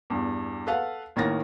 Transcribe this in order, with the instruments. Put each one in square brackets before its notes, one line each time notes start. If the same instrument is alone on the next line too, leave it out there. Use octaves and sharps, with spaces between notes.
[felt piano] E2 G2
A4 B4 F5 F#5
A1 D#3 A#3 C#5 A6 A#6